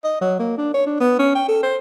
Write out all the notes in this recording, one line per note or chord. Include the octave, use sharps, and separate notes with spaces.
D#5
F#3
A#3
D4
C#5
D4
B3
C#4
G5
A4
C5